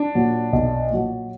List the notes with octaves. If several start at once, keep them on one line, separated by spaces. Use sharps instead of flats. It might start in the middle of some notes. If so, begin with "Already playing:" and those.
Already playing: D4
A#2 F#3
B1
A#2 F#3